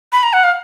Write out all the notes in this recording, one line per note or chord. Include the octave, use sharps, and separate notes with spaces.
B5
A#5
F#5
F5